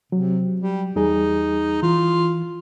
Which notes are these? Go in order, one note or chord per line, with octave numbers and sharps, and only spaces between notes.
C3 F#3
G3
E2 G3 D#4 G#4
E3 F4